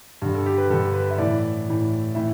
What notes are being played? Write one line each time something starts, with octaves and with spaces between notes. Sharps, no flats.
G2 D3
A4
G4
B4
G2 D3 A4
B4
E5
A2 E3 D5
A2 E3
A2 E3 E5